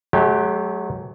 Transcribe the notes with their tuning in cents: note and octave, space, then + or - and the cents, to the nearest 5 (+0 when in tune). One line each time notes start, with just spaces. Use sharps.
F#3 +5 A3 -45 G4 +0